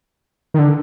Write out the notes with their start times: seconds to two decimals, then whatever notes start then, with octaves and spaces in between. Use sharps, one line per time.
0.54 D#3
0.59 D3